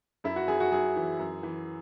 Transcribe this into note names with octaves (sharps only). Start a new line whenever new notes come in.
F#2 E4
F#4
F#2 G#4
F#4
F#2 G#4
E3
F#2
E3